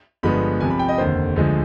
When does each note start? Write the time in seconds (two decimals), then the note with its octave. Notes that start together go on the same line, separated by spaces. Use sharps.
0.23 G1 G2 F3 G#3 B3 B5
0.61 C2 C3 F3 G#5
0.70 B5
0.79 G5
0.89 D#5
0.98 F1 D#2 D3 C5
1.36 D2 D3 F3 G#3